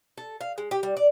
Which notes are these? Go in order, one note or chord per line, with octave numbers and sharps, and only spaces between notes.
A4
F5
G#3
G4
G3
D5